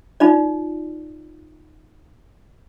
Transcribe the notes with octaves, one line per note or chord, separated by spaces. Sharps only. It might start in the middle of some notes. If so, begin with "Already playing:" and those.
D#4 F4 D5